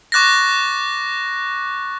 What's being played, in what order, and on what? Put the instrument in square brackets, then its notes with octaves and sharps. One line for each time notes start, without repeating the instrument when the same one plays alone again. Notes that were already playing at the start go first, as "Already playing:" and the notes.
[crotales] C#6 D6 F#6 A6 A#6